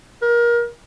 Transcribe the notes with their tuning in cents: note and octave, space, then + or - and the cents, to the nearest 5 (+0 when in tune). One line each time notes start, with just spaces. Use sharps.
A#4 +25